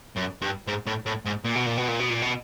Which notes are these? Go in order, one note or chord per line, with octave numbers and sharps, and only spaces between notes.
F#2
G2
G#2
A2
A2
G#2
A#2
B2
A#2
B2
A#2
B2
A#2
B2